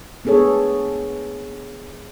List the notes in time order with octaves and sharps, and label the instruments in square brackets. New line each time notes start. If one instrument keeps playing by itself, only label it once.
[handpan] B3 D4 G#4 A4 C#5